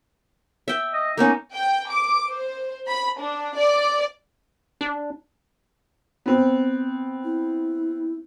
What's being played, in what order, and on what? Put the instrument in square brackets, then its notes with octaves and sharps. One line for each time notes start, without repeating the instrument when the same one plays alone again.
[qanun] E5 G5
[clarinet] D#5
[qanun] A#3 B3 C#4 [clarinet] D#4
[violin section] G5
D6
C5
B5
D4
D5
[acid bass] D4
[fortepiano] B3 C4
[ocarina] E4